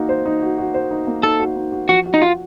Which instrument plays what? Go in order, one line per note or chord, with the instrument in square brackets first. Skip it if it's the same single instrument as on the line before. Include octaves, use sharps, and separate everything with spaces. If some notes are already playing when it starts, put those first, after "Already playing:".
Already playing: [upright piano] A#3 D#4 F#4
C5
D#4
F#4
F#4
C5
D#4
A#3
[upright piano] D#4 [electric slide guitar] A4
[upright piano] F#4
D#4
F#4
[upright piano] F3 [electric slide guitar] F#4
[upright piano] F#4
[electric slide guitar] D#4
[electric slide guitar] F4 [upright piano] F#4